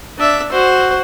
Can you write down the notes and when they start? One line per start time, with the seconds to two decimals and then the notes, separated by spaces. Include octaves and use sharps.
0.18 D4 E5
0.52 F#4 C5